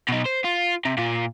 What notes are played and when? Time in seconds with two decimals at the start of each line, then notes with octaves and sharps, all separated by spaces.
0.08 B2 D#4
0.25 C5
0.44 F4
0.85 C3
0.97 A#2 F4